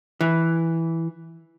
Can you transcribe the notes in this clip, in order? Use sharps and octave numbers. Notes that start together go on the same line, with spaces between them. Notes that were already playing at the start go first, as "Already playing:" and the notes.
E3